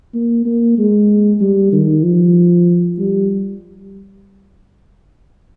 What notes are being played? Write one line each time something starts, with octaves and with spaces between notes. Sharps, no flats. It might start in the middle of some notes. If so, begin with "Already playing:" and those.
A#3
A#3
G#3
G3
D#3
F3
G3